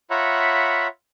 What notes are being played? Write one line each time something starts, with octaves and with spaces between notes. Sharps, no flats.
F4 C#5 E5 F#5 A#5 B5